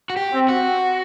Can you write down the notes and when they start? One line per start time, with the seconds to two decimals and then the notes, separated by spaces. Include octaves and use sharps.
0.10 F#4
0.16 G4
0.33 C4
0.49 F#4